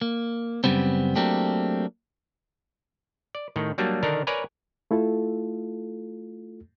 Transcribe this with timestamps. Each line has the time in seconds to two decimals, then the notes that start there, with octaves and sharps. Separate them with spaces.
0.02 A#3
0.64 F#2 C#3 G3 B3 C4
1.16 F#3 A3 A#3 C4 D4 G4
3.35 D5
3.56 A2 D#3
3.78 F#3 G3 A#3 D4
4.03 D3 D#3 D4 A#4
4.27 A#4 B4 C#5 D5 G#5 A#5
4.91 A3 E4 F4 A4